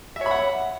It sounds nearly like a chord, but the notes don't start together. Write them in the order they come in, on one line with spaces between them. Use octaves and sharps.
E5 C#5 B5 F#5